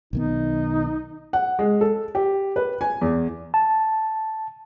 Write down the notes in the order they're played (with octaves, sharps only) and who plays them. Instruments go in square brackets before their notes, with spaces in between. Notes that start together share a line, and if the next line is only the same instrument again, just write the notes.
[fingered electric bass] B1 D#3 B3 [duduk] D#4
[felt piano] F#5
G#3
A4
G4
B4
G#5
E2
[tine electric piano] A5